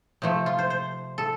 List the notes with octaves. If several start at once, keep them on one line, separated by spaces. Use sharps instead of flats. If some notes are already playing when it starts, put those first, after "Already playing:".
C3 F3 A3
F4
C5
C5
A4